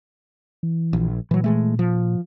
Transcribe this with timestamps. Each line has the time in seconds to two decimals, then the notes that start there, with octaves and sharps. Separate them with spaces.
0.63 E3
0.93 A#1
1.31 A#2 E3 F#3
1.44 E3 G#3 A3
1.79 F3